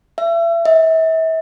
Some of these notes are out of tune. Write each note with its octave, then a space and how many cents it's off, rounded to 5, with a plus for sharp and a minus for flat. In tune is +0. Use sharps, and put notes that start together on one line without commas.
E5 +35
E5 -35